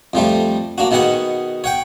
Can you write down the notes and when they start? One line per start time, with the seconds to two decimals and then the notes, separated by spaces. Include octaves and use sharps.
0.14 F2 F3 G3 A3
0.78 A#3 D4 F#4
0.91 B2 D#3 B3 G#4 F#5
1.64 C#5 F#5 G5